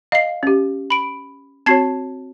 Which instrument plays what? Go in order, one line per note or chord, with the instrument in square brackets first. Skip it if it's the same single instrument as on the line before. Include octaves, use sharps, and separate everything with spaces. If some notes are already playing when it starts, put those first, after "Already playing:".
[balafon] D#5 [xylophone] F5 C7
[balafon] C#4 G4
[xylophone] B5 D7
[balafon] C4 F#4 C#5 [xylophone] A5 G#6 C7